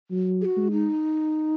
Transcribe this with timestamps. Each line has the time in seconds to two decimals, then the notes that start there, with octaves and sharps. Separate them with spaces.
0.11 F#3
0.41 G#4
0.45 F#4
0.57 G#3
0.72 D#4